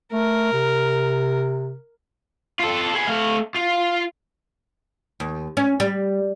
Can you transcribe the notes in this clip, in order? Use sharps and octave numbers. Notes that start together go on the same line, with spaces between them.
A3 A#4
C3
F4 A4
B3 G#4
A3 F5
F4
D#2
C#4
G3